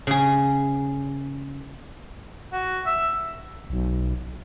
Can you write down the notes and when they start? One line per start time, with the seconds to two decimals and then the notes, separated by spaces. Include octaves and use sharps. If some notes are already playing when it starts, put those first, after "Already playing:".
0.07 C#3 G#4
2.52 F#4
2.86 E5
3.70 B1